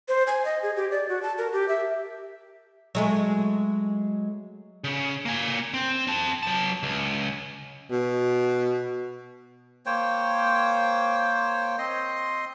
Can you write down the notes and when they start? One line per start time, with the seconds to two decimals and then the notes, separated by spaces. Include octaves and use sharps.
0.08 C5
0.27 G#5
0.45 D#5
0.63 G#4
0.77 G4
0.91 D5
1.09 F#4
1.22 A5
1.38 A#4
1.53 G4
1.68 E5
2.95 F#3 G#3 A3
4.84 C#3
5.26 A#3 G#5
5.74 C4
6.07 C4 A5
6.43 F#3 A5
6.83 C#2
7.91 B2
9.86 A#3 C5 C#5 G5
11.78 C4 D#5 C6